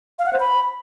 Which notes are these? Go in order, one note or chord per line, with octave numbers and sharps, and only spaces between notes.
F5
F#5
C5
B5